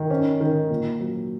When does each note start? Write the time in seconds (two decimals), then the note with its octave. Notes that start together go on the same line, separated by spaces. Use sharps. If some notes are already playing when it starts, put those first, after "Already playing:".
Already playing: D#3
0.10 C#4
0.40 D#3
0.70 A#2
1.00 F#3